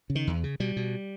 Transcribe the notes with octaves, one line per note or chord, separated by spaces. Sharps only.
C#3
D#3
E2
C#3
B2 G3
B2